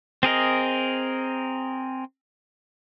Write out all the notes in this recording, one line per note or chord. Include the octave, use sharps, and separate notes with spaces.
C4 G#4 A#4 D#5